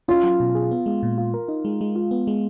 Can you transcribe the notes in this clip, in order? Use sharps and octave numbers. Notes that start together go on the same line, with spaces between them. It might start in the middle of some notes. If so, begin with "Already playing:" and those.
C#4 F4
F#3
B2
G#4
B3
G#3
A#2
F4
A#4
D#4
G#3
G#3
F4
B3
G#3